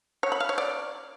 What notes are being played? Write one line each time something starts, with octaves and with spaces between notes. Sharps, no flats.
C#5
B5
F5
C#5
D5